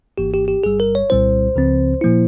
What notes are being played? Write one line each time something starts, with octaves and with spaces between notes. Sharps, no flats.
G#1 G#2 E3 A#3 G4
G4
G4
G1 G2 G3 G#4
A#4
C#5
C2 A#2 G3 C4 E4 C5
C#2 C#3 F3 C4
A#2 F3 A#3 E4